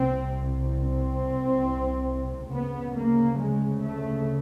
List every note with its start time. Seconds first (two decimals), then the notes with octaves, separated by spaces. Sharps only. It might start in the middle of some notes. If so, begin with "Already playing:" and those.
Already playing: C2 C3 C4
0.78 C4
2.51 D2 C#3 B3
2.94 A#3
3.37 G#3
3.79 A3